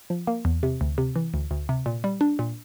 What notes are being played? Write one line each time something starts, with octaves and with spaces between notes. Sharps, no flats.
F3
A#3
E2
C3
D2
C3
E3
D2
D2
C3
A#2
G3
D4
A#2